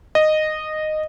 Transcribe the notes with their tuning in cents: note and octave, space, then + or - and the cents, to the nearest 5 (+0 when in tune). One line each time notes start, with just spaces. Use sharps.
D#5 -10